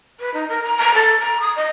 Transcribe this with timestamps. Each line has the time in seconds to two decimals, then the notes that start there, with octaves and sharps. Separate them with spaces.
0.19 B4
0.34 D#4
0.48 A#4
0.63 A#5
0.77 A#5
0.94 A4
1.20 A#5
1.40 D#6
1.56 D#5